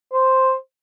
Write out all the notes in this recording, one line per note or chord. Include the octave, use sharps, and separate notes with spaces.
C5